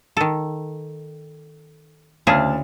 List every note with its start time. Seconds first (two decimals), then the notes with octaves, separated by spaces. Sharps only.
0.17 D#3 A4
2.27 D2 C#3 E4 G#4 A5 F6